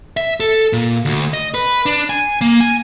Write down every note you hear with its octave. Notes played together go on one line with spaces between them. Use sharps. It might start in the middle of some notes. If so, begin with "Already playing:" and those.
E5
A4
A#2
D2
D#5
B4
D4
G#5
A#3
G#5